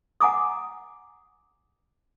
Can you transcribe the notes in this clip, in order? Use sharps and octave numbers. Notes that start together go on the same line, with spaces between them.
F#5 G#5 A#5 D6 D#6